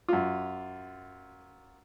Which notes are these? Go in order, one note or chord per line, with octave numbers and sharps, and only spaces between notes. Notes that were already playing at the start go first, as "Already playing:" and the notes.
F#2 F4